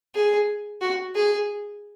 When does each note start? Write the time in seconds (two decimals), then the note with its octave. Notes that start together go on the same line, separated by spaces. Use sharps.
0.15 G#4
0.81 F#4
1.15 G#4